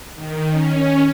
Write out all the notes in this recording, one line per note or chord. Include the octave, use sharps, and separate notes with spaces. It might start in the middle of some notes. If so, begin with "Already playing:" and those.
D#3
C#4